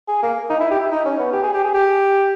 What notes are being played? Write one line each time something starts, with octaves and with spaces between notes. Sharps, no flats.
G#4
A#3
D#4
E4
G4
E4
D#4
C#4
B3
G4
G#4
G4
G#4
G4